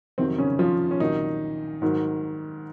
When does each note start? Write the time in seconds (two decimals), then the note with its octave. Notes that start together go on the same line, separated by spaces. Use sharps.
0.18 F2 C3 D#3 F#3 C4
0.38 C#3 C#4
0.59 F3 F4
0.91 C#4
1.00 C2 A#2 D#3 F#3 D#4
1.82 G#2 D#3 F#3